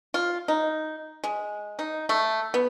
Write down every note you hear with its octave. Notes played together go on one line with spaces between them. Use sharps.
F4
D#4
G#3
D#4
A3
B3